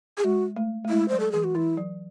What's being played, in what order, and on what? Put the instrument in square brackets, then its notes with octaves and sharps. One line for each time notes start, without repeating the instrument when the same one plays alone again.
[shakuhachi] G#4
[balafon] G#3 [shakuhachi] F#4
[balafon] A3
A3
[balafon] G#3 [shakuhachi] E4
[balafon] F#3 [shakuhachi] C5
[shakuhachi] A4
[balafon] E3 [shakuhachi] G#4
[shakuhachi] F#4
[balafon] E3 [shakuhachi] E4
[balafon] F#3